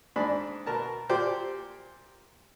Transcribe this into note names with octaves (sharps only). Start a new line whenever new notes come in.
G#2 D4 B5
B2 A#4 A5
A#2 G4 C5 D5